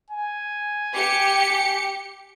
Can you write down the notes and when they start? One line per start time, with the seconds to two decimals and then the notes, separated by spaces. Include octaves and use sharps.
0.10 G#5
0.93 G4 C#7